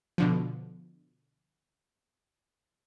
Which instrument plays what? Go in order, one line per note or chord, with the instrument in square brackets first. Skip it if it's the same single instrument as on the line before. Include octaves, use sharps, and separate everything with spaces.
[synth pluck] B2 D3 F3